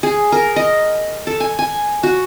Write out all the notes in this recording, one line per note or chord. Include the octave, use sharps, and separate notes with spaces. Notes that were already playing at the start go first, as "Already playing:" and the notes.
G#4
A#4
D#5
A4
G#5
G#5
F#4